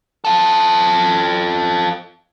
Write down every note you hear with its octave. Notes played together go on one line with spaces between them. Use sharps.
F4 A4